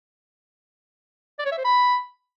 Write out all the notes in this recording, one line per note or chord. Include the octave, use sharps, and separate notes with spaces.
D5
C#5
E5
C5
B5